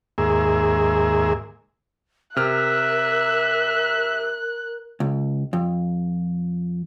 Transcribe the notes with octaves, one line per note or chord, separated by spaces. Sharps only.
D#2 G#2 A#3 G#4 E5
C3 A#4 E5 F6 F#6
C#2
F2